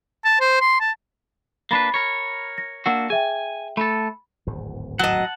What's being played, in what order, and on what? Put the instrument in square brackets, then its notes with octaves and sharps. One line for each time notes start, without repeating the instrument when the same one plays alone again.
[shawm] A5
C5
C6
A5
[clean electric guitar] A#3 D4 B4 [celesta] B5 A6 C7
[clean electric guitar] A#4 C#5
[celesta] A#6
[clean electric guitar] A#3 D4 F#4 [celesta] F#5 E6
[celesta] G#4 E5 G5 [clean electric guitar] G#5
[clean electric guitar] A3 A4 [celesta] B5
[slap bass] D1 G#1 E2
[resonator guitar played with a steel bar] F#3 D#5 [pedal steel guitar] F#5 A5